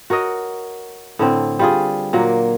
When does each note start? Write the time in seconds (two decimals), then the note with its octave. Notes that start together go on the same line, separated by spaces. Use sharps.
0.10 F#4 A#4 C#5 D#5
1.19 A2 D3 C4
1.59 G3 F4 G#4
2.13 A#2 F#3 A#3